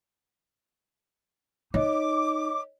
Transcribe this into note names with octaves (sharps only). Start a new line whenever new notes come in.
D#4 C#5 D#5 D6